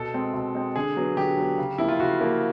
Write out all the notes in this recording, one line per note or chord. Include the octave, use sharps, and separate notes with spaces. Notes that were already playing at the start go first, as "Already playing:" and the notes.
Already playing: B2 A4
G#3 C4
B2
G#3 C4
D3 G#4
F#3 B3
D3 G4
F#3 B3
C#3
F3 A#3 E4
F4
C#3 F#4
F3 A#3